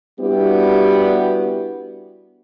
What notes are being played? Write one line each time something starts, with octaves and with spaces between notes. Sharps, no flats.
G3 B3 D4 E4 F#4 G4